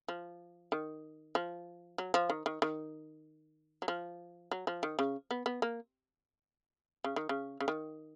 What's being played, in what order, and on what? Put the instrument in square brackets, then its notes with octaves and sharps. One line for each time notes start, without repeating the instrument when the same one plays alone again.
[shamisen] F3
D#3
F3
F#3
F3
D#3
D#3
D#3
F#3
F3
F#3
F3
D#3
C#3
B3
B3
A#3
C#3
D#3
C#3
C#3
D#3